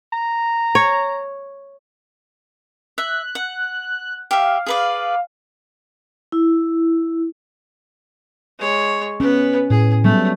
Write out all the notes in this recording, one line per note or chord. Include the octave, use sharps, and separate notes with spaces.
A#5
C#5
E5 F#6
F#5
G4 E5 F5
G#4 B4 D5
E4
G#3 C#5
B3 C#4 B4
A2 G#4
F#3 G3 A3 B3